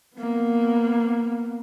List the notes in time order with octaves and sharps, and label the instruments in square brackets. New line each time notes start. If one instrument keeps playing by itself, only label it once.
[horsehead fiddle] A#3 B3